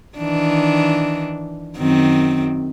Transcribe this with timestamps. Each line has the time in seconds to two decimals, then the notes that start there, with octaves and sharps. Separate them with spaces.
0.18 D#3 E3 D4
1.77 F#2 D#3 C4